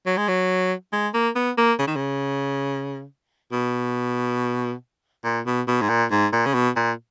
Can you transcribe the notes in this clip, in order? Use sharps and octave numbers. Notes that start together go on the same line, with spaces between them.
F#3
G#3
F#3
G#3
A#3
B3
A#3
C#3
D#3
C#3
B2
A#2
B2
B2
G#2
A#2
G#2
A#2
C#3
B2
A#2